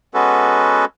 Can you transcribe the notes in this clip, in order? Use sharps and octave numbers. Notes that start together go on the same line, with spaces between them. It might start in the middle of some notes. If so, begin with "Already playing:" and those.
G#3 B3 C#4 F#4 A4 B4